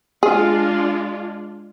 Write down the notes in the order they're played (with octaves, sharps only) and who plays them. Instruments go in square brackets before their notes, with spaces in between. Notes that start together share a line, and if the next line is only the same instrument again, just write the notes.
[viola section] G#3 D4 F4 [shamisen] G#4